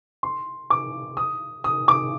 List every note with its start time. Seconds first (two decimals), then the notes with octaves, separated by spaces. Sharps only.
0.23 C6
0.70 D6
1.17 D#6
1.64 D#6
1.88 D6